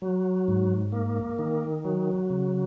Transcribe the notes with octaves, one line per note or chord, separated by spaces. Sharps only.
F#3
G#2
A#3
D#3
F#3
C#3